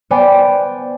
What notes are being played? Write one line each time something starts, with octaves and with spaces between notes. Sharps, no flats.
B3 C5 D5 G5 G#5